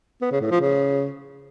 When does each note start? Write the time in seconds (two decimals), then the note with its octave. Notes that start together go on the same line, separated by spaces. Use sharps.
0.22 B3
0.31 C#3
0.41 A2
0.51 F3
0.61 C#3